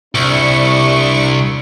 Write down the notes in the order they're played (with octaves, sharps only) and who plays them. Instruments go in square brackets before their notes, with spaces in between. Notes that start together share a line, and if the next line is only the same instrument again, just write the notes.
[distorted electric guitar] C2 [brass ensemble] D4 E4 [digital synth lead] C#6